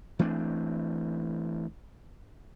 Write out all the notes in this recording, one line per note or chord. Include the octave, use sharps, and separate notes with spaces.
E3 A3 C4 D4